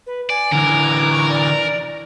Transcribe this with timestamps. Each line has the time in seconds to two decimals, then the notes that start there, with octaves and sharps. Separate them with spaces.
0.07 B4
0.30 D5 G#5
0.52 D3 E3 A#4
1.12 C#6
1.30 D5